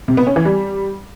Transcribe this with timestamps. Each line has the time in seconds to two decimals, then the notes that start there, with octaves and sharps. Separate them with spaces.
0.08 C3
0.17 B3
0.27 C#4
0.36 E3
0.45 G3